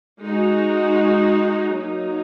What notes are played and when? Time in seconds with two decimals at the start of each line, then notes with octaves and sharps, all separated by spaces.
0.21 G#3 D#4 F#4
1.75 F#3 A#3 D#4